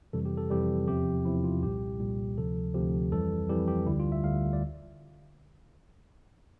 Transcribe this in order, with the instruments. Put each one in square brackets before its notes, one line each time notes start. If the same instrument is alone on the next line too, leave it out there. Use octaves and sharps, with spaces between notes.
[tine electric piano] F2 C3 E3 G3 A4
G4
A4
F2 C3 E3 G3 G4
E2 C3 F3 G4
E2 C3 F3 E4
F4
C2 A#2 G3 G4
C2 A#2 G3
D2 C3 F3 A4
D2 C3 F3 G4
F2 E3 G3 A4
F2 E3 G3 G4
G4
D2 D3 G3 E4
F4
E5
D2 D3 G3 F5
D5